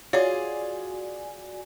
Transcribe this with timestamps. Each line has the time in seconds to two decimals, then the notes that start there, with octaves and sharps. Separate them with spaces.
0.13 F4 F#4 G#4 C#5 D5 G#5